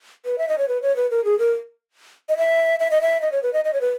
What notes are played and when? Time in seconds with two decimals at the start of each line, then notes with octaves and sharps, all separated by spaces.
0.25 B4
0.38 E5
0.48 D#5
0.58 C#5
0.68 B4
0.82 C#5
0.96 B4
1.11 A#4
1.25 G#4
1.39 A#4
2.29 D#5
2.37 E5
2.80 E5
2.91 D#5
3.02 E5
3.22 D#5
3.32 C#5
3.43 B4
3.53 D#5
3.65 D#5
3.73 C#5
3.81 B4